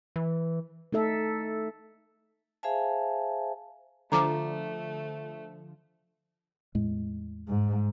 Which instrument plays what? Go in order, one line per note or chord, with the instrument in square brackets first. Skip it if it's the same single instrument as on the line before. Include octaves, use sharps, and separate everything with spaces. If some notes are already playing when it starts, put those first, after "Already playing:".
[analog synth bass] E3
[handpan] A3 D#4 A4 E5
[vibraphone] G#4 C5 E5 F5 G#5 A5
[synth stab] D3 F3 [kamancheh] A3 [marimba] A#5 D6
[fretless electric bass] E2 A2 G#3
[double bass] G#2